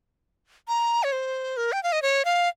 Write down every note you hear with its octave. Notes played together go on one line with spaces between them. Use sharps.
A#5
C#5
C5
A#4
G5
F5
D#5
C#5
F5